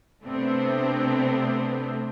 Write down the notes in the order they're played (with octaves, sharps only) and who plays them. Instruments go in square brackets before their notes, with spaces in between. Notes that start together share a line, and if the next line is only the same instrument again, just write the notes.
[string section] C3 A3 B3 C4 D4